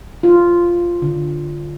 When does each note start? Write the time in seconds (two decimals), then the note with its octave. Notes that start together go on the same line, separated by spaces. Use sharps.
0.23 F4
1.02 D3